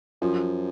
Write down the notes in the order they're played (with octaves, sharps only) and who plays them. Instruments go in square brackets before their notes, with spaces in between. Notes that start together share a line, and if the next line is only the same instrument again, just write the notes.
[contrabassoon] F#2 [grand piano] F3